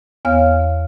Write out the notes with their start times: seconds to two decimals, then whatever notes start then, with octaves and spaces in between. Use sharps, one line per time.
0.25 E2 B3 C#5 F5 F6